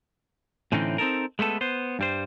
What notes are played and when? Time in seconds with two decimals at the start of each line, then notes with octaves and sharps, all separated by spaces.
0.72 A2 D3 E3 C4 C#4 D#4
0.98 C4 D#4 A4 A#4
1.39 G#3 A3 B3 A4
1.61 B3 C5
1.99 G2 G3 C5